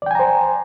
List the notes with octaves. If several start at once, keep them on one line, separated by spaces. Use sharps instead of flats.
C5 D5 G5 G#5 A#5